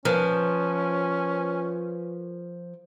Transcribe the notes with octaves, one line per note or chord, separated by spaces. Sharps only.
F3 C#4 A#4 B4